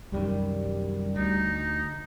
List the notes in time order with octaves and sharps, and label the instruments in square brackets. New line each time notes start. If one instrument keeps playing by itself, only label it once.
[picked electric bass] C2 F#2 D#3 [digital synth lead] G3
[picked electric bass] D2 [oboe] D#4